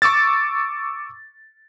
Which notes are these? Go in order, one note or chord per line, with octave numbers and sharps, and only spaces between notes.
C#6 D6 E6 A6